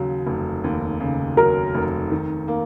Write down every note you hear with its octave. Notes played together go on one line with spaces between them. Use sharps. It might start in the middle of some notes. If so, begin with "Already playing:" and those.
Already playing: D#2 C#3 F#3
F1
D#2
C#3
F#3 A#4
F1
D#3
A#3